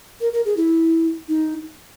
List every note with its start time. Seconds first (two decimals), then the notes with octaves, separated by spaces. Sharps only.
0.21 A#4
0.33 A#4
0.45 G#4
0.57 E4
1.29 D#4